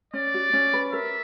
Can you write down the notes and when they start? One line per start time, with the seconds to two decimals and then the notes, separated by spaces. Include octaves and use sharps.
0.14 C#4 D5
0.34 F#4
0.53 C#4
0.74 B4
0.93 A#4 E5